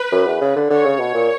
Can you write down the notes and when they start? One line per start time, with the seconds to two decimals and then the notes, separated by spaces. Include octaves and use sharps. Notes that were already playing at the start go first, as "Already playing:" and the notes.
Already playing: B4
0.12 F#2
0.27 E2
0.41 C#3
0.56 D3
0.70 D3 C#5
0.85 C#3
0.99 B2
1.14 A#2